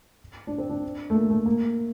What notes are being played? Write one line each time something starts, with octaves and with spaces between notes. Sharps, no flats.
D4
C4
D4
A3
A#3
A3
A#3